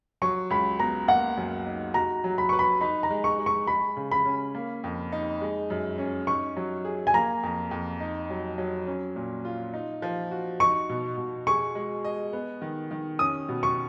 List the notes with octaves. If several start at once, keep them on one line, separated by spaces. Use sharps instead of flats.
F#3 C#6
C#2 B5
B3 A#5
A#3 F#5
F#2
D#4
F#4 A#5
F#3
B5
B4 C#6
B5
D#4 B5
A#5
G#3
C#6
G#3
C#6
G#3 B5
C#3
B5
C#4
A#3
F2
D#4
G#3
F#2
C#4
D#4 C#6
F#3
G#4
G#5
A#3 A#5
F2
F2
D#4
F#3
F#3
C#4
A#2
F4
D#4
F3
F#4
D#4 C#6
B2
B2
G#4 C#6
G#3
D#5
B3
D#3
D#3
C#4 D#6
B2
C#6